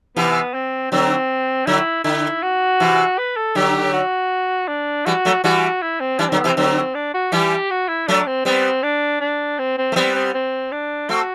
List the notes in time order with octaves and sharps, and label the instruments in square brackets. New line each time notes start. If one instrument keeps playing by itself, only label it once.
[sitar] C3 E3 [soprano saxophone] B3
[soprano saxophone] C4
[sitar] D3 F#3 [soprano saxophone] C4
[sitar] D3 F#3 [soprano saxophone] E4
[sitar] D3 [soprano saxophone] E4
[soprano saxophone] F#4
[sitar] C3 E3
[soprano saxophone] B4
A4
[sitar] D3 F#3 [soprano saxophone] G4
[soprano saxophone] F#4
D4
[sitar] E3 G3 [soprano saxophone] F#4
[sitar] F#3 A3
[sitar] E3 G3 [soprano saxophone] F#4
[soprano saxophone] E4
C4
[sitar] E3 G3 [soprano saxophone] D4
[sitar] D3 F#3 [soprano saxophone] C4
[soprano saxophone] B3
[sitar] C3 E3 [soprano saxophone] C4
[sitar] D3 F#3 [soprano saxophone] C4
[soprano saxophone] D4
F#4
[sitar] E3 G3 [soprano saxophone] G4
[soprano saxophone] F#4
E4
[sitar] F#3 A3 [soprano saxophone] D4
[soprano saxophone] C4
[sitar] G3 B3 [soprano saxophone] C4
[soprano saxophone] D4
D4
C4
C4
[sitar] A3
[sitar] G3 B3 [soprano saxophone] C4
[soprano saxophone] C4
C4
D4
[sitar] A3 C4 [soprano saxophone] F#4